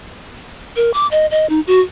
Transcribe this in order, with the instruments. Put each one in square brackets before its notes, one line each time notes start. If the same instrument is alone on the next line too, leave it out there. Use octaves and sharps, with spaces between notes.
[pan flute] A#4
D6
D#5
D#5
D#4
F#4